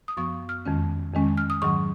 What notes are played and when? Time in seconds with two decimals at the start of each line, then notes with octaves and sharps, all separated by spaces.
0.08 D#6
0.17 F#2 F3 B3 C#6
0.49 F6
0.66 F2 D#3 G#3 C#4
1.14 F2 D#3 G#3 C#4
1.37 F6
1.50 D#6
1.62 G#2 D#3 F#3 C#6